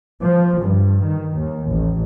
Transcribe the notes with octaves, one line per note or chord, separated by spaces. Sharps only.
F3
G2
D#3
D#2
A1